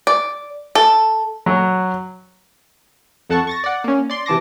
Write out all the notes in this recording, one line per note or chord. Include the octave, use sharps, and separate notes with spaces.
D5
A4
F#3
F2 A4 F#5 A5 C#6
C#6 A6 A#6
D5 F#5
A#3 C#4
D5 C6
C3 E3 A5 D6 A#6